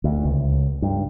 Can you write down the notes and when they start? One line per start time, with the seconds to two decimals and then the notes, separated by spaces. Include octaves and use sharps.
0.04 D2
0.24 C#2
0.82 G2